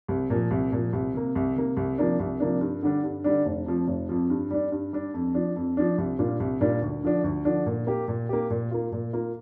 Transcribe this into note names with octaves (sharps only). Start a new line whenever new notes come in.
C2
A#2 F3
C2
A#2 F3
C2
C3 A#3
C2
C3 A#3
C2
C3 F3 A#3 D4
C2
C3 F3 A#3 D4
G2
D3 G3 D4
G2
D3 G3 D4
F1
F2 F3
F1
F2 F3
G2
G3 D4
G2
G3 D4
F2
F3 D4
F2
F3 D4
C2
A#2 G3 D4 F4
C2
A#2 G3 D4 F4
D2
D3 F3 D4
D2
D3 F3 D4
A#2
A#3 G4
A#2
A#3 G4
A#2
A#3 F4
A#2
A#3 F4